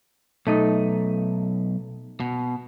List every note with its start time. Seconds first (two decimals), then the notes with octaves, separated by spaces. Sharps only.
0.47 B1 A3 D#4
2.20 B2